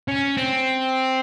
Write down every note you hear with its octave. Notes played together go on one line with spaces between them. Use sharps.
C#4
C4